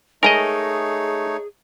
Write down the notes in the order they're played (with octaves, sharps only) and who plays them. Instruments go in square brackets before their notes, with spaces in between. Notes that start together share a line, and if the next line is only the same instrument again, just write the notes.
[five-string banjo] G#3 A#5 [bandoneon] A3 D#4 C#5 [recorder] G#4 [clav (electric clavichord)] A#4 D#5